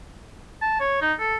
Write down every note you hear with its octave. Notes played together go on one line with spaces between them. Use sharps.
A5
C#5
D#4
A4